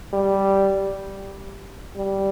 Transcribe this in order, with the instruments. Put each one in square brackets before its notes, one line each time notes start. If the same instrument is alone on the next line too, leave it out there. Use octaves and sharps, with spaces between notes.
[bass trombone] G3
G3